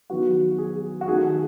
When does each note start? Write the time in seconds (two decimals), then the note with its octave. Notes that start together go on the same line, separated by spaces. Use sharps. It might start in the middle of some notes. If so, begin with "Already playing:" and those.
0.10 D#3 F#3 B3 F#4
0.58 G#4
1.01 F#4
1.08 D#3 A3 G#4
1.24 G#4